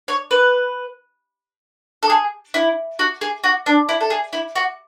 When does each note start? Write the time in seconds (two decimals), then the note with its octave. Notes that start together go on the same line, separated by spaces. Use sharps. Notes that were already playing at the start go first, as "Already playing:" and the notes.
0.08 C#5
0.31 B4
2.03 A4
2.10 G#4
2.54 E4
2.99 F#4
3.21 G#4
3.44 F#4
3.66 D4
3.89 E4
4.01 A4
4.10 G#4
4.33 E4
4.56 F#4